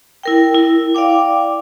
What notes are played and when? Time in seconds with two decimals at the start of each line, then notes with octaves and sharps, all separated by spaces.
0.23 E4 A#4 G5
0.55 E4
0.94 D5 F5 G5 D6